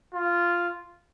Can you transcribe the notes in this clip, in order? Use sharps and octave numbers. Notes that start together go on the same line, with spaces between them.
F4